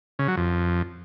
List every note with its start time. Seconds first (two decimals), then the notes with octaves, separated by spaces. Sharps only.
0.19 C#3
0.28 F#3
0.37 F2